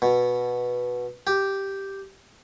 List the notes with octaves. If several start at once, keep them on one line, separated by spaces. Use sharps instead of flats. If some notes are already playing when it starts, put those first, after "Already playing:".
B2
G4